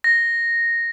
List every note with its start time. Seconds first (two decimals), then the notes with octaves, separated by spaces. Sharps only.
0.04 A#6